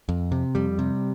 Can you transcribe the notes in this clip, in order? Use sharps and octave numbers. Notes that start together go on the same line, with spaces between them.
F2
C3
F2 G3
C3